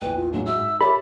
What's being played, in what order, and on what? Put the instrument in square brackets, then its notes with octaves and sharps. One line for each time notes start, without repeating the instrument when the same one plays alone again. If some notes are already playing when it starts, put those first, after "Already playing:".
[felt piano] A#1 E2 [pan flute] B4 [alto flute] G5
[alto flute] F4
[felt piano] A2 F#3 G#3 [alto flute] A#3 [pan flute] D4
[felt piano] G#3 F#4 [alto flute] E5 [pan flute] E6
[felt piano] G#2
[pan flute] G4 [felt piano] A4 C#5 E5 [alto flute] A#4 [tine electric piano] B5